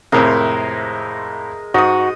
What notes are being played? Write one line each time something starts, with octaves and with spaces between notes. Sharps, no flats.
F2 A2 C3 G#3 A#4
G#2 F#4 D#5 D#6